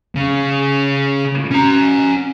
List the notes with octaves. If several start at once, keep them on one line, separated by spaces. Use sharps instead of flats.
C#3
C#4 A#5